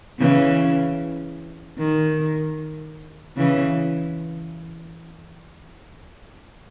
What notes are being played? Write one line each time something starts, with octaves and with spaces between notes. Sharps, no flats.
C#3 E3
D#3
C#3 E3